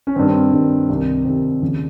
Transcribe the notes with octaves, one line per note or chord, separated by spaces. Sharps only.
C#4
G2 D#3 C4
C4
G2 D#3
C2 C3 D#3
C2 C3 D#3 C4
D#2 C#3 F3